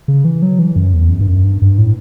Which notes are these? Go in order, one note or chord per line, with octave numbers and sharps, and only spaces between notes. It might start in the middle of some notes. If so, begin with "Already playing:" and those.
C#3
E3
F#3
E3
F#2
E2
F#2
G2
F#2
G2
G2
A2